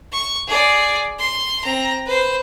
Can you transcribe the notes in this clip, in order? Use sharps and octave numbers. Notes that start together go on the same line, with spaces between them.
C#6
G#4 D5
C6
C4 A#5
B4 C5